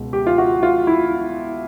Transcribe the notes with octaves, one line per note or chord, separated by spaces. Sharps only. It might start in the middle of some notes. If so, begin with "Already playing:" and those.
Already playing: C#2 B2
G4
F4
F#4
F4
E4